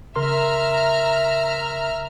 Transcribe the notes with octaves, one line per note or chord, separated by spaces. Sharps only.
C#3 A#4 E5 A#5 C6 F6